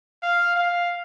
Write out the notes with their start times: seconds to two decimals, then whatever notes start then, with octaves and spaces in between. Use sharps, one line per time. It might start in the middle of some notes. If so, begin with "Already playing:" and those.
0.23 F5
0.56 F5